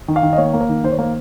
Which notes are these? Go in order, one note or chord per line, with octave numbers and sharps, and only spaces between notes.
D#3
F5
D#3
D#5
A#3 C#5
A#3
A#4
D#3
D#3 C5
C#5
A#3 C5